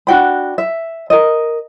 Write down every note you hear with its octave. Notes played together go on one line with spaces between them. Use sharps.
D4 F#4 G5 B5
E5
A#4 D#5